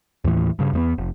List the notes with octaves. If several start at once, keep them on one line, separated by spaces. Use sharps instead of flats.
D#2 A2 E3
G2 C#3
E2 G3 B3
F1